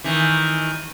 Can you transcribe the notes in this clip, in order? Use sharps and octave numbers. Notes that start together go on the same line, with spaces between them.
D#3 E3